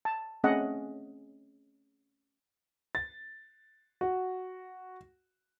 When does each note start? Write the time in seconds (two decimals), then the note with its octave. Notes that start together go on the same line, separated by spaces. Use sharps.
0.05 A5
0.44 A3 C4 C#4 G#4 D#5 F#5
2.95 A6
4.01 F#4